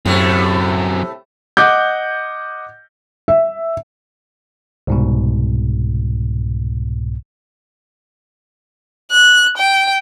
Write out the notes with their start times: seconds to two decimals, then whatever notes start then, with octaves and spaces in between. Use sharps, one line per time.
0.06 F#2 A2 C3 F#3 A3 C4
1.57 D#5 F#5 D6 G6
3.28 E5
4.87 C2 G#2 B2
9.11 F#6
9.57 G5